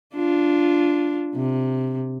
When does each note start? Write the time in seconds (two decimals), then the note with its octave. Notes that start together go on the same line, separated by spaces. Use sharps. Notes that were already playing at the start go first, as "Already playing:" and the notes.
0.15 D4 F4
1.34 C3